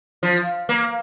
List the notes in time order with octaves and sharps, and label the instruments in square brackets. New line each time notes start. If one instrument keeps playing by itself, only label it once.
[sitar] F3
A#3